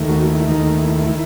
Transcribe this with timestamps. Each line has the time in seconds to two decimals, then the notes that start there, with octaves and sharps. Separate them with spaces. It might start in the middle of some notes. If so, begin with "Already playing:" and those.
Already playing: D#2 D#3 A3
0.09 F#4
0.28 E4
0.48 D#2 D#3 A3 D#4
0.78 E4
1.06 D#3 E4